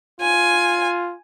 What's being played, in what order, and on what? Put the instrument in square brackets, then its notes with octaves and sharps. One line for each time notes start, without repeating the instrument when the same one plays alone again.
[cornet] F4 [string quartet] G#5